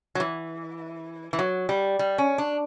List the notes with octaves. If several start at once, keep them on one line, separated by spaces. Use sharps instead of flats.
F#3
E3
E3
F#3
G3
G3
C#4
D4